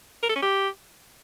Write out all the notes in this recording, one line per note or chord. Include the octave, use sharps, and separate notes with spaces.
A#4
A4
C#4
G4